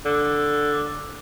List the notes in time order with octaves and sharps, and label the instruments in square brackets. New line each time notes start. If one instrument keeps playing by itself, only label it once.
[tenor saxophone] D3